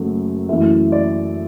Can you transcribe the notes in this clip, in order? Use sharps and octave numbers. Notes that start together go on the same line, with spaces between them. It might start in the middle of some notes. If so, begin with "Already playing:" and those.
Already playing: F#1 F#2 F#3 A3
F#2 E3 A3 E5
D5